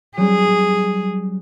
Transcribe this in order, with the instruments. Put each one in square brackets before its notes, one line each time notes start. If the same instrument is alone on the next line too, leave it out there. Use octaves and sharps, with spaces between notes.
[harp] F#3 G3 C#4 [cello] G#4